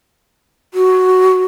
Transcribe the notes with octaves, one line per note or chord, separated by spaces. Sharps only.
F#4